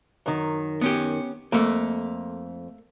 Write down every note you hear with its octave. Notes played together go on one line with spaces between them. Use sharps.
F#2 D#3
B3 C#4 G4
F2 A3 A#3